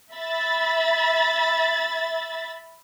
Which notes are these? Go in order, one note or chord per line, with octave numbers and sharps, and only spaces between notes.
E5 B5 A6